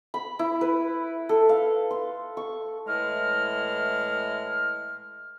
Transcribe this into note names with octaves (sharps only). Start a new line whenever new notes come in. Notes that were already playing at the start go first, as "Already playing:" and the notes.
B5
E4
B4
A4
F5
C6
C#6
A2 E3 G#3 F6